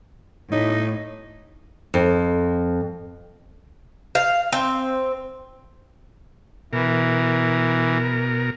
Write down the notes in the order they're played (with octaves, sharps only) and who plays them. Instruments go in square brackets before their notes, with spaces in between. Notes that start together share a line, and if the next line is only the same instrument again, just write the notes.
[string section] A2 [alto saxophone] D#4
[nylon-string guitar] F2
[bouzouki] F5
C4
[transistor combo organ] B2 A#4 [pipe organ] E3